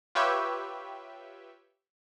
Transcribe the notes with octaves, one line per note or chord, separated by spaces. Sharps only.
F4 G4 B4 C#5 E5 G5